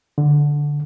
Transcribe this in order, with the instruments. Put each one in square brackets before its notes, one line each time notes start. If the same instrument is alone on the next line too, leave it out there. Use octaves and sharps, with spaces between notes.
[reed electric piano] D3